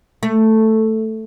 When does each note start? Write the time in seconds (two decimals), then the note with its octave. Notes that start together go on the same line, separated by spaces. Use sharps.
0.23 A3